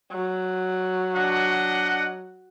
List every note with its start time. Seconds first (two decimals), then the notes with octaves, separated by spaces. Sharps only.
0.12 F#3
1.15 D4 D#5 F#5